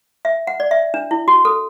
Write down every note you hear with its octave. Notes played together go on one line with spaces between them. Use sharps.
E5
F#5
D5
E5
D4
E4
F#4
A4